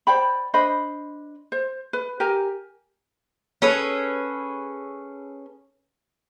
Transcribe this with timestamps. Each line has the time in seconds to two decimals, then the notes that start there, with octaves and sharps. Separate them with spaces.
0.07 C5 D5 G5 B5
0.54 D4 C5 D#5 B5
1.52 C5
1.93 B4
2.20 G4 A#4 G#5 A#5
3.62 C#4 G#4 A4 B4